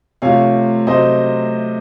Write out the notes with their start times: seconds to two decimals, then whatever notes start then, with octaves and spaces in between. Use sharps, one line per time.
0.22 C3 F3 A3 C#5 F5
0.87 C3 F#3 A3 C5 D#5